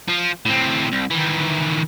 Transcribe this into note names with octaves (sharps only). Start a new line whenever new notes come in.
F3 F4
A2 C4
C2
D#3 E3